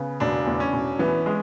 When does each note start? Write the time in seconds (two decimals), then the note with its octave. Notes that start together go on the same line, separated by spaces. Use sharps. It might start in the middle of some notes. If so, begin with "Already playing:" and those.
Already playing: C#3 B3
0.20 E1 D4
0.47 E2
0.60 C#4
0.73 E1
0.99 E3 B3
1.26 G#3